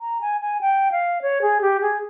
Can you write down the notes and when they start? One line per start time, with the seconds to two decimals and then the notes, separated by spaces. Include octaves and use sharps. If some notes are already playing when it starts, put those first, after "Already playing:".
0.01 A#5
0.21 G#5
0.41 G#5
0.61 G5
0.92 F5
1.22 C#5
1.42 G#4
1.61 G4
1.81 G#4